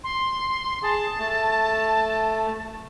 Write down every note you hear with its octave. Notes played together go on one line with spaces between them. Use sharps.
C6
G#4 A5
A3